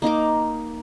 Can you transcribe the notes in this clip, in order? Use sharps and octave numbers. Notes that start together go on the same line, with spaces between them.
A#3 D#4 A#4 D6